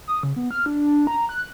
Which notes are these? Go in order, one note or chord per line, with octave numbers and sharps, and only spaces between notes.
D#6
C#3
B3
F6
D4
A#5
F#6